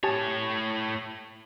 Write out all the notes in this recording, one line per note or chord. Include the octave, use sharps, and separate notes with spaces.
A2 G4 C#5 G#5 A5